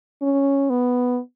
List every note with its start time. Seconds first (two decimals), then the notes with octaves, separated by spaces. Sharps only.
0.22 C#4
0.70 B3